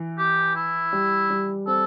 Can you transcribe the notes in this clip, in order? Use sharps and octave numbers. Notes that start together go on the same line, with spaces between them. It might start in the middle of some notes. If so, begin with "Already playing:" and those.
Already playing: E3
G4
E4
G3
G3
C4 A4